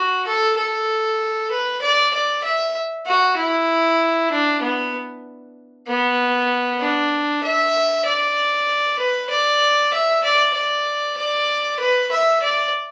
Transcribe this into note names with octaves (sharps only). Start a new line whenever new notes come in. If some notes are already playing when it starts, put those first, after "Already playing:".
Already playing: F#4
A4
A4
B4
D5
D5
E5
F#4
E4
D4
B3
B3
D4
E5
D5
B4
D5
E5
D5
D5
D5
B4
E5
D5